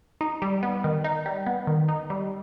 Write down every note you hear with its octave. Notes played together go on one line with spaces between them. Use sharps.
D#4
G3
B3
D#3
D#4
G3
B3
D#3
D#4
G3